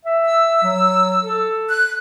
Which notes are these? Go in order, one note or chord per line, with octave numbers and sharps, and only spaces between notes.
E5
E6
F#3
A4
F#6